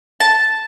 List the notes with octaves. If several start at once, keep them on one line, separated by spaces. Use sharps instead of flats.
A5